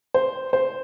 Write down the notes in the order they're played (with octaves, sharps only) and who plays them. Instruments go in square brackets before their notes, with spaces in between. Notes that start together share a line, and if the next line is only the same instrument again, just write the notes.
[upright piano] C5
C5